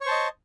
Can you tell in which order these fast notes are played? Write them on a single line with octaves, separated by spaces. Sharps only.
C#5 C#6 C5 A5 D#5